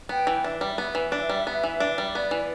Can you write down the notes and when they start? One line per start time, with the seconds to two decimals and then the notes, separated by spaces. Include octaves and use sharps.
0.09 B3 G5
0.27 E3
0.44 D4 E5
0.61 G3
0.78 B3 E5
0.95 E3
1.12 D4
1.30 G3
1.47 B3
1.64 E3
1.80 D4
1.98 G3
2.15 B3 D5
2.31 E3